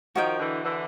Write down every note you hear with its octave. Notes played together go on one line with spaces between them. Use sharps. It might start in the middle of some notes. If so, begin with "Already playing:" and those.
D#3 F3 F#4 A#4 D#5 G5
D3 E3
D3 E3